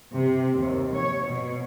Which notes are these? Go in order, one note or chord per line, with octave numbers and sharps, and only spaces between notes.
C3
D#2
C#5
B2